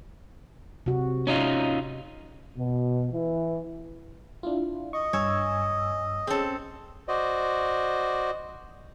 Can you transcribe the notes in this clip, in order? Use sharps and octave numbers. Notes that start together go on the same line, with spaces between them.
C3 F#4
C#4 D#4 F4
B2
E3
D4 E4 F4
D#5 C#6
G2 C#5 G#5 E6
C4 C#4 G#4 A4
F#4 C5 D5 D#5